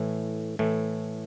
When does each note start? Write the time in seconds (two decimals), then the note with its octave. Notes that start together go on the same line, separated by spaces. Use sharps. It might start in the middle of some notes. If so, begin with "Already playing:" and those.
Already playing: A2 E3 A3
0.59 A2 E3 A3